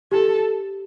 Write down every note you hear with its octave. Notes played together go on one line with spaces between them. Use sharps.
G4 A4